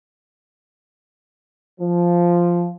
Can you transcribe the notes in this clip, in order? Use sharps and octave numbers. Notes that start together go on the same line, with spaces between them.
F3